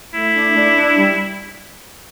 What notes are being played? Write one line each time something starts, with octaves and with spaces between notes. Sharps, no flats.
A3 E4
D4
D4
D4
G3